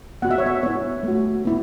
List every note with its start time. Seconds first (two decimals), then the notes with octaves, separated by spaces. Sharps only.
0.22 B3 F#4 F#5
0.31 E5
0.38 C#5
0.46 E5
0.63 B3 E4 C#5
1.03 A3 F#4
1.45 B3 E4